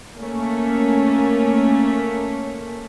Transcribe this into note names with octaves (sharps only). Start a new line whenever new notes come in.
A3 A#3 C#4